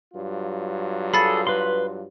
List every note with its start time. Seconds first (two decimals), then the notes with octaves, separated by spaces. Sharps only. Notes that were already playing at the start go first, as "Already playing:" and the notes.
0.14 G2 F#3 F4
1.14 G#4 A4 B5 A6
1.47 B4 C6